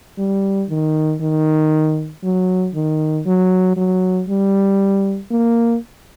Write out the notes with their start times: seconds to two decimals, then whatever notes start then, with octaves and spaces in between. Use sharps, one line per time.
0.18 G3
0.69 D#3
1.21 D#3
2.23 F#3
2.74 D#3
3.26 F#3
3.77 F#3
4.28 G3
5.31 A#3